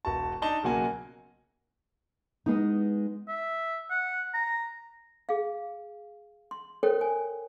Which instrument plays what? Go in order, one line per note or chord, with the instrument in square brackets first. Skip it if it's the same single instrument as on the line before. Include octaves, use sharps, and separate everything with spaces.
[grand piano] E1 F#4 A5
D4 D#4 A5 G7
B1 C#3 F#3 A#3 F#5 G#5
[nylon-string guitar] G#3 B3 D#4
[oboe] E5
F#5
A#5
[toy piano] G#4 F5
C6
A4 A#4 C5 C#5 G5
G#5